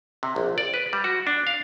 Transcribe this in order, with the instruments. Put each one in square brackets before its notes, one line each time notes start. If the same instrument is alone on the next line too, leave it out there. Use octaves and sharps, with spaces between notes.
[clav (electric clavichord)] C3
A#1
D5
B4
G3
F#4
D4
F5